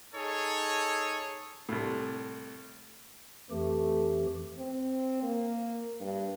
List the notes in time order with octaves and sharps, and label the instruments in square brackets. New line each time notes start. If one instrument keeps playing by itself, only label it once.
[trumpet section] D#4 G#4 A4 C#5
[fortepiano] C2 A2
[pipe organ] F2 E3 G4 [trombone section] A3
[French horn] C4
A#3
G2